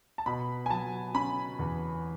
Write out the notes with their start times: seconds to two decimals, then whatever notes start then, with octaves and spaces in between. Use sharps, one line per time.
0.18 A5
0.26 B2 B5
0.66 G#5
0.70 F#3 A5
1.15 C#4 B5
1.59 E2